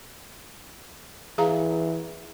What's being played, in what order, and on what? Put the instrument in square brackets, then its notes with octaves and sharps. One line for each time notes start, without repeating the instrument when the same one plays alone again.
[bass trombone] E3 [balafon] G#4 F5 A#5